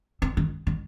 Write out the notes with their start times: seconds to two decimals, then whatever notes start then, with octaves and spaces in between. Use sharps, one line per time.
0.22 C4
0.37 D#3
0.67 D#3